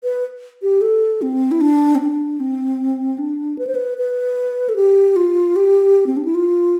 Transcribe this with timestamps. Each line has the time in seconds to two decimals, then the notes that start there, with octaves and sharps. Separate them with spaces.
0.04 B4
0.62 G4
0.81 A4
1.22 C4
1.51 E4
1.61 D4
1.95 C4
2.00 D4
2.40 C4
3.18 D4
3.59 B4
3.67 C5
3.75 B4
3.98 B4
4.69 A4
4.76 G4
5.16 F4
5.56 G4
6.07 C4
6.17 D4
6.25 E4
6.35 F4